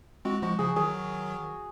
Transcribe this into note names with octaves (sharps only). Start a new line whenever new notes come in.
G#3 C4 F#4
F3 G#3 F#4
C#3 F3 G#4
D#3 F#3 G#4